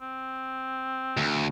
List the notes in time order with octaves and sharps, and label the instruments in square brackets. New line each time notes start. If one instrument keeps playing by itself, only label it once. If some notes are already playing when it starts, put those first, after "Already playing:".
[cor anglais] C4
[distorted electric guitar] D2